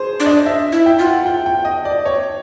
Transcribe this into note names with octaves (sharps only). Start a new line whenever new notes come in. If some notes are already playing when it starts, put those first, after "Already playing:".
Already playing: G#4 C5
D4
D#5
E5
E4
G5
F4
F#5
G5
G5
D#5
D5
C#5